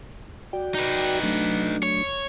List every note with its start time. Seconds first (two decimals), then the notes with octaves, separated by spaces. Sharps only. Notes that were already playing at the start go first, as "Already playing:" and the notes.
0.53 F#4 D5 G5
0.74 D#4 B4
1.23 F#3 A3 D4
1.83 C#5